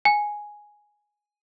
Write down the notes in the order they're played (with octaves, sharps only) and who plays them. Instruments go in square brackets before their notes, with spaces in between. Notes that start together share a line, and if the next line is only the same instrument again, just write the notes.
[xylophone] G#5